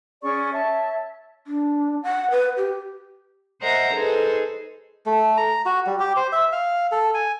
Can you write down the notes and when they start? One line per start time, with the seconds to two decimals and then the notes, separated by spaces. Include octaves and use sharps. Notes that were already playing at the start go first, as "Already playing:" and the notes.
0.23 C#4 G#4 D5 C#6
0.52 C#5 E5 A5
1.47 D4
2.03 F#5
2.31 B4
2.57 G4
3.61 A#4 C5 D#5 E5 F#5 A#5
3.94 D#4 G#4 A4 B4 C5
5.06 A3
5.37 A#5
5.66 F#4
5.87 G3
6.00 G4
6.16 C5
6.32 E5
6.52 F5
6.92 A4
7.14 G#5